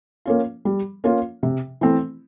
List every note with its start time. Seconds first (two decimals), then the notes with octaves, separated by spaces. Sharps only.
0.26 A#3 C#4 F4
0.65 G3
1.04 A#3 C#4 F4
1.43 C3
1.81 E3 A3 C4